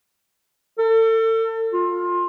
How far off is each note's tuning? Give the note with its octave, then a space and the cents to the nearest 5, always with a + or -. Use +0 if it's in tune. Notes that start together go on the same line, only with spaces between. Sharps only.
A4 +35
F4 +20